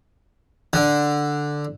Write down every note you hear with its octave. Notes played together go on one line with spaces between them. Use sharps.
D3